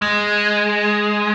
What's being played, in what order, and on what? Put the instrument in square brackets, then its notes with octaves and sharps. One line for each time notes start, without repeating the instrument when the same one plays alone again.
[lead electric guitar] G#3